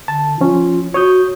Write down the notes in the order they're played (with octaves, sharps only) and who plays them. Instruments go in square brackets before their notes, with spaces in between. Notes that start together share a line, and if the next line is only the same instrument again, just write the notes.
[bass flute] D3 [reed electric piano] A5
[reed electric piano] F3 C#4 [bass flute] F4
[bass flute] F#4 [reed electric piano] C#5 D#6 G6